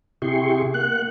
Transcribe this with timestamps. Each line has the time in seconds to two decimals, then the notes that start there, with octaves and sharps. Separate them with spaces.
0.22 C3 E4 G4 G#4 C6 C#6
0.74 A#3 F#5 F#6